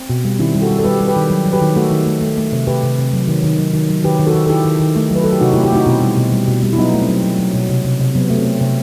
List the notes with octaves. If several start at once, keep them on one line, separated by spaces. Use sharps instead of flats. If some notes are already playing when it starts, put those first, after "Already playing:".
Already playing: C4
B2
G3
D#3 C4 E4
G3
F#4 A4
G3
A4
G3 G4 B4
G3
G4 B4
D#3
F#3
F#3
G4 B4
D#3
A3 F#4 A4
D#3
A3
A3
A3
C3
C3 G4 B4
C3
C3
F#3
D#3
D#3
F#3
D#3
F#3
D#3 G4 B4
D#3
F#4 A4
D#3
A4
D#3 E4 G4
D#3
D#3
A3
F#3 B4
F#3 A4
G4
C3 D#4 F#4
E4 G4
A3
E4 G4
A3 D#4 F#4
B2 C4 E4
G3
B2
G3
B2
G3
E4
F#3 B3 D#4
A3
C4
F#3
F#3
F#3
B2
C3
C3
C3
F#3 B3
A3
C4
A3
C3